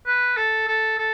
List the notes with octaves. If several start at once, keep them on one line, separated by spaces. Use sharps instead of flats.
B4
A4
A4
A4